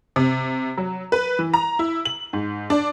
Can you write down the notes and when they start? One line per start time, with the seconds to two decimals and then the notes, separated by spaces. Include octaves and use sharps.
0.16 C3
0.77 F#3
1.12 B4
1.39 E3
1.54 A#5
1.79 E4
2.05 F#7
2.33 G#2
2.70 D4